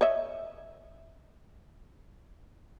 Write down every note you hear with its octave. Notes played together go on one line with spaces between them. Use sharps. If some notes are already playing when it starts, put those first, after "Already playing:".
C#5 D#5 E5